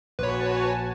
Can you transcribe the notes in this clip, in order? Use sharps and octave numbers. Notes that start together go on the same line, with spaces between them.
A#1 F#4 B4 C#5 G#5 A5